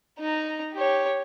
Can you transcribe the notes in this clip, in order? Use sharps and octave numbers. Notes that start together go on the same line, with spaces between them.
D#4 A#5
G4 C#5